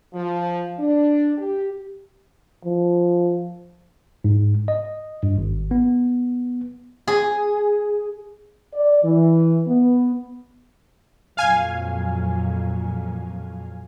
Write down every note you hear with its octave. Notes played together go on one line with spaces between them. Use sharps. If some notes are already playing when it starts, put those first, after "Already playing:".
F3
D4
G4
F3
G#2
D#5
G2
G#1
B3
G#4
D5
E3
B3
F2 A#2 F#3 F5 G#5